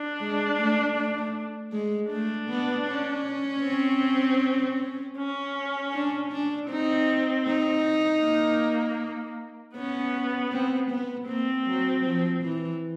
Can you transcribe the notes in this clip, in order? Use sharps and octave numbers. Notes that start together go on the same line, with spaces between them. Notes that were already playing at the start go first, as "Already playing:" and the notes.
Already playing: D4
G#3
A3
A3
G#3
A3 D4
B3
C#4
C4
C#4
D4
D4
C4 D#4
D#4
A#3
B3 C#4
C4
B3
A#3 C4
F#3
F3
E3